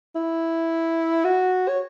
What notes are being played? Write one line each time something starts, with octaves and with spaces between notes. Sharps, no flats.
E4
F#4
C#5